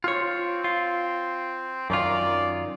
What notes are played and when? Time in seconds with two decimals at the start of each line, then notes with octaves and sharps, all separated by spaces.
0.04 C4 F4 C#5
0.64 F4
1.90 F#2 D#3 F4 D5